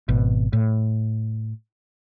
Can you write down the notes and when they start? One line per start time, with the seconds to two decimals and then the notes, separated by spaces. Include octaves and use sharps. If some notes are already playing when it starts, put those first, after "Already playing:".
0.08 G#1 B2
0.53 A2